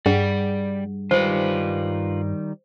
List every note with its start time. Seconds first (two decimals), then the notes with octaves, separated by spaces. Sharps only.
0.06 G2 G3 G#4 D5 F#5
1.11 D#3 G3 D#4 F4 B4 C5